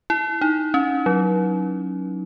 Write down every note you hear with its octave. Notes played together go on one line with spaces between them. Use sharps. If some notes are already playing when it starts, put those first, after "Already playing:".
E4
D#4
C#4
F#3